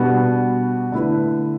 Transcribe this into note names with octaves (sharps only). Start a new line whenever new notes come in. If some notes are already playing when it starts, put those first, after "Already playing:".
Already playing: B2 G3 B3 D4 F#4
D3 A3 E4 B4